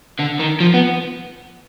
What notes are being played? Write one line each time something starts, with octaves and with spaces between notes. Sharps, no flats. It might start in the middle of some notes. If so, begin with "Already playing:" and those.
D3
D#3
F3
B3